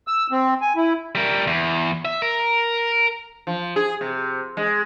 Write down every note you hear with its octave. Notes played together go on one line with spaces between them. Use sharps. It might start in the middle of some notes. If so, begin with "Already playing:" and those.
E6
C4
G#5
E4
G3 A#4
E2
E5
A#4
F3
G#4
C3
G#3